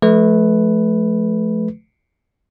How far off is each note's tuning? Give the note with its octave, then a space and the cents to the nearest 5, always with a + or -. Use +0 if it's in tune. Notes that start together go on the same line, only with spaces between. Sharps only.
F3 +0 A3 -30 B4 +0